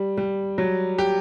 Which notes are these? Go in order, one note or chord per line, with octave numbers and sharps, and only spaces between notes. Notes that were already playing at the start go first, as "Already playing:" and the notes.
Already playing: G3
G3
F#3
G4